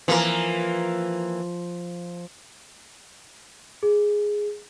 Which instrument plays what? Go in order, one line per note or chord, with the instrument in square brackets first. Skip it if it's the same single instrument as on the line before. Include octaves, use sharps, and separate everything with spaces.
[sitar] E3 A#3 A#4 [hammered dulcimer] F3
[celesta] G#4